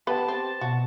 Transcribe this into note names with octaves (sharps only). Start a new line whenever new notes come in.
B3 G4 B4 C5 G5 A5
C4
B2 F#4